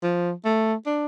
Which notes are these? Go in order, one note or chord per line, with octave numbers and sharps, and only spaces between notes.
F3
A3
D4